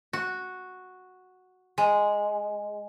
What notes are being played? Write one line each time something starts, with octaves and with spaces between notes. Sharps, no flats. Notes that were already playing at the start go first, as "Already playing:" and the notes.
F#4
G#3